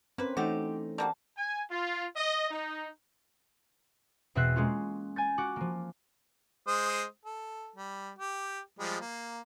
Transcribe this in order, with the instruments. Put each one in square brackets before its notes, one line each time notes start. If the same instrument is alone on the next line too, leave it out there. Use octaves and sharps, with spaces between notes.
[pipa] A#3 B4 [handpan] C4 C#4 C5
[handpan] E3 [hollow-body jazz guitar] A3 D#4 [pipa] F#4 G4
[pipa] G3 A#3 F#4 [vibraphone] A5
[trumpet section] G#5
F4
D#5
D#4
[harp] E2 B2 C4 E5 F#6 C7
G#3 A#3 C#4 F4
G#5 G6 A6
F#4 D6
F3 A#3
[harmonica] G#3 C5 D#6
A4
G3
G4
F3 G3 G#3
A#3